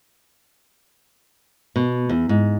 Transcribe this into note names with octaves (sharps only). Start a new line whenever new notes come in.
B2
E2
G#2